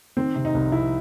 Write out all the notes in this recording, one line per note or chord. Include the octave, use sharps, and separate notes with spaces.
D#3 C4
C3
D#4
C2
C3 E4